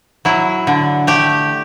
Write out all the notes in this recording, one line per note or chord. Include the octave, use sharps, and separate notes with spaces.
F#3 E4
D3
A3 G4